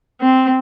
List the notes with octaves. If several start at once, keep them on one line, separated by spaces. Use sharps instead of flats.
C4